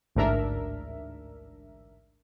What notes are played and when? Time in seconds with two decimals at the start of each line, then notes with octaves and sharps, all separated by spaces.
0.15 A1 D2 G#2 D4 A#4 E5